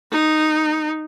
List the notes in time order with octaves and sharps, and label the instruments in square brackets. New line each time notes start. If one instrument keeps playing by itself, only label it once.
[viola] D#4